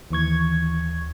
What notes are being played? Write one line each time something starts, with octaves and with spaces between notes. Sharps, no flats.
D#2 E3 C#6 G#6